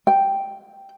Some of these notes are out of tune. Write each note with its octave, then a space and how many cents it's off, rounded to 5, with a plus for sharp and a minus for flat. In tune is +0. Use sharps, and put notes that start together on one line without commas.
G5 +0